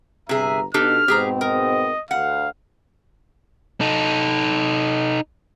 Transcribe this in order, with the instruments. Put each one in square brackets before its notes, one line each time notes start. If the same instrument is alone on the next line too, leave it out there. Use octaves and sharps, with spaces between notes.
[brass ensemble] G1 G2 A#5 [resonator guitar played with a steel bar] C3 G#4 [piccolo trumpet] E5
[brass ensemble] B2 D#4 [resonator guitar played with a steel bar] D4 G4 A4 [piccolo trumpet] F6
[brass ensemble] G#2 B2 C4 [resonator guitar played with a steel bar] G4 G#4 A#5
[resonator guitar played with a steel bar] A#4 [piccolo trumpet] D#5
[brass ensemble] D2 [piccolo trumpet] F5 [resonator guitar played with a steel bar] F#5
[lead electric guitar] D#4 A4